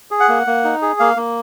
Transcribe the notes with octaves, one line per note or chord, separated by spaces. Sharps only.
G#4
F#5
A#3
A#3
D#4
G#4
A#3 F5
A#3